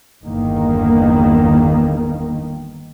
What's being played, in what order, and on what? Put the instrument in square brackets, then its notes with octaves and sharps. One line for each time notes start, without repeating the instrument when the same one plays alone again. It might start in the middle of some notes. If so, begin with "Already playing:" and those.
[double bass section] G1 E2 D#3 A#3